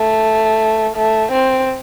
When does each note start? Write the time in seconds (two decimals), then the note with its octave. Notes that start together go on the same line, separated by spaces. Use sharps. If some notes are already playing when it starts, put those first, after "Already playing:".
Already playing: A3
0.97 A3
1.32 C4